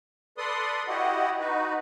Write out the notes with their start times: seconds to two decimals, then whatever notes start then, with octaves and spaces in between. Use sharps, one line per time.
0.38 A4 B4 D5 C6 D#6
0.88 E4 F#4 G4 D#5 F#5
1.40 D#4 F#4 B4